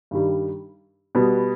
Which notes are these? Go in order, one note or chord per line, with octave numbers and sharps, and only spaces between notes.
G2 D#3 G3
B2 G3 B3